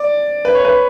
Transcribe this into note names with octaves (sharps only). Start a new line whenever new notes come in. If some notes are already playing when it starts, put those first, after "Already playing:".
Already playing: D5
B4
C#5
B4